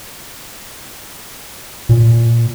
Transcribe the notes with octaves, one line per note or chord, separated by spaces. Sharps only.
A#2